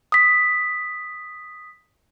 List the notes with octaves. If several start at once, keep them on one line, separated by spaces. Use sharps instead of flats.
D#6 B6